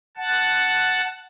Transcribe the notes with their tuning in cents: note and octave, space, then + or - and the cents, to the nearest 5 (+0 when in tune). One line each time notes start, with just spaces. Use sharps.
F#5 +0 A5 +0